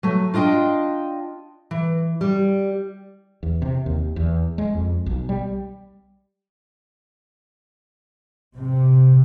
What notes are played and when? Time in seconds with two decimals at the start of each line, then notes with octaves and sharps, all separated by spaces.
0.03 F#3 A3
0.34 D4 F4 D#5 G5
1.71 E3
2.21 G3
3.43 E2
3.62 C3
3.86 D#2
4.16 E2
4.58 G#3
4.75 F2
5.06 B1
5.29 G3
8.57 C3